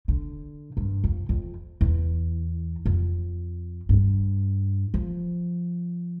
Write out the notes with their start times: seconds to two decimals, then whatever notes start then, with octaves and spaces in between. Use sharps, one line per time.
0.08 D3
0.77 G2
1.04 F2
1.29 F2
1.81 E2
2.86 F2
3.89 G2
4.94 F3